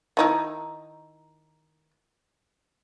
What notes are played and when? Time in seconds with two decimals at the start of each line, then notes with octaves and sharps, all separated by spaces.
0.17 D#3 D#4 E4